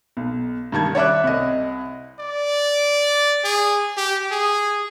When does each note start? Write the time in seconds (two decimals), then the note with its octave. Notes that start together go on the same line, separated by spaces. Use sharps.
0.17 B1
0.72 G2 D#3 A5 G#6
0.95 C#5 D5 E5 D6 F#6
1.24 C2 D#5
2.20 D5
3.44 G#4
3.97 G4
4.31 G#4